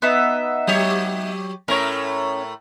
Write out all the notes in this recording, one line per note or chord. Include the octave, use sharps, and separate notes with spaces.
B3 D#4 E5
F#3 G4 C#5
A2 A3 C#4 A#4 C#5